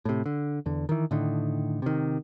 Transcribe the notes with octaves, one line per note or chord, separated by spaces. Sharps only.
A2 C3
D3
E2 D3
D#3 E3
A2 D3 D#3
C3 D#3